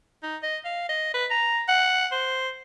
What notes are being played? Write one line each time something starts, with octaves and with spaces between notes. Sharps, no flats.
D#4
D#5
F5
D#5
B4
A#5
F#5
C5